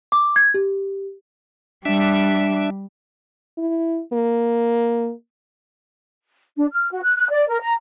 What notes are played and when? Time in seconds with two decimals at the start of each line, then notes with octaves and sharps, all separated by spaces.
0.12 D6
0.36 G#6
0.54 G4
1.85 G3 D4 E5
3.58 E4
4.13 A#3
6.56 D4
6.72 F6
6.91 F#4
7.03 F#6
7.16 F#6
7.31 D5
7.48 A#4
7.61 A#5